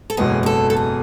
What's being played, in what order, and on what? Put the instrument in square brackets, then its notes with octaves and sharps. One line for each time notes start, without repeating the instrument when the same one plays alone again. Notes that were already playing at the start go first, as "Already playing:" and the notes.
[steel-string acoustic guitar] A4
[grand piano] F#1 E2 B2 G#3 B3 [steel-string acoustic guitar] G#4
[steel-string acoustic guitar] G#4
A4
A4
G#4